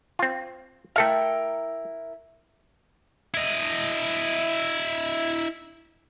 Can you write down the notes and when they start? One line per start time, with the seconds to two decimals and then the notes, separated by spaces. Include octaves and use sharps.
0.19 C4 F4
0.96 A3 E4 A4 A#4 F5 G5
3.34 E4 D#5